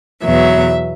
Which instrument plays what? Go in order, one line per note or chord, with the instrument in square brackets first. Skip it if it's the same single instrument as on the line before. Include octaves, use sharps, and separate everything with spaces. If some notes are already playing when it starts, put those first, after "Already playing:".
[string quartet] E2 B2 F#3 E5